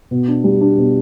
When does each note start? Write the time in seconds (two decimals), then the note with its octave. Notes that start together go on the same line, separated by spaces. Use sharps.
0.11 B2
0.28 D4
0.44 G3
0.61 D4
0.77 B2